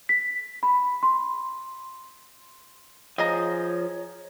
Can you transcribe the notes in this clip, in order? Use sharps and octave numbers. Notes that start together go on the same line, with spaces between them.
B6
B5
C6
F3 G#4 C#5 D#5 A#5